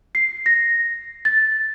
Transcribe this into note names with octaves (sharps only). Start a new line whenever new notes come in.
C7
A#6
A6